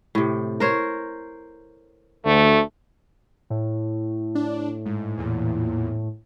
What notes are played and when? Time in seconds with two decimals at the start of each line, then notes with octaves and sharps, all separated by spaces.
0.15 A2 C3
0.60 A#4 C5 C#5
2.25 D2 A3
3.50 A2
4.35 D4
4.86 G#2
5.18 E2 A#2